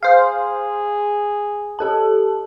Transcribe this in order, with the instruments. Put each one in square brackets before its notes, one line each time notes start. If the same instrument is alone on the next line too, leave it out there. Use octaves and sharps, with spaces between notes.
[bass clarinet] G#4 [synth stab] C5 F5
[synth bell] G4 A4 A5